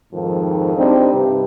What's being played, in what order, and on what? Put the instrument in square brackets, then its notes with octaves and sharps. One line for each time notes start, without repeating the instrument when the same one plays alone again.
[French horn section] F2 G#2 D#3 F3
G3 C4 D4 D#4
G2 C3